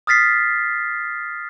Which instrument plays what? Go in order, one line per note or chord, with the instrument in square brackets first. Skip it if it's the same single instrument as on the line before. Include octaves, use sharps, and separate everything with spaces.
[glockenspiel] D#6 F6 A6 B6 C7